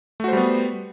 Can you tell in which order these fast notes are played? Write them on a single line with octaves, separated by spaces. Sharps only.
A3 F#4 C5 G3 B3